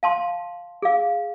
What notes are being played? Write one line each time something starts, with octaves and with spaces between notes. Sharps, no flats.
F5 A5 C6
G#4 F5